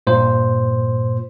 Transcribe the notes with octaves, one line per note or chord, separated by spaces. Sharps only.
G2 A#2 C5